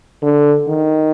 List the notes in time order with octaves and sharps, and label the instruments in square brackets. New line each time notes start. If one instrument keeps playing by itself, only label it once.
[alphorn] D3
D#3